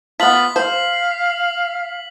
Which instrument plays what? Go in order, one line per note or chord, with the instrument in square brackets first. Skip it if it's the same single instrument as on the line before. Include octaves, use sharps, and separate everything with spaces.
[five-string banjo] B3 F4 [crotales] B6 F#7
[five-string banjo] C5 [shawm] F5